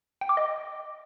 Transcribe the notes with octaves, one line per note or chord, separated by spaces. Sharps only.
G5
D6
D#5